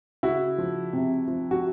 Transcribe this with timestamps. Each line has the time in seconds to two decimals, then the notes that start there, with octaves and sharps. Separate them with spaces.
0.23 C#3 E4 F#4
0.58 F3
0.93 C3
1.28 F3
1.51 F#4